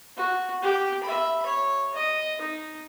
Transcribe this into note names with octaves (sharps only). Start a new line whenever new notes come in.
F#4
G4
E5 B5
C#5
D#5
D#4